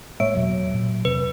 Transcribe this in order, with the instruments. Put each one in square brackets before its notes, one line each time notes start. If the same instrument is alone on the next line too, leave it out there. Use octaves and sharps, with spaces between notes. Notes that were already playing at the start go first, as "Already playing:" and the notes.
[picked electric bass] A2 G#3 A#3 [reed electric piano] C#5 E5 [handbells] D7
[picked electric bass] E2 B2 [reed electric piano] F#3
[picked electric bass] A#2
[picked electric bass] E2 C3 [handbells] B4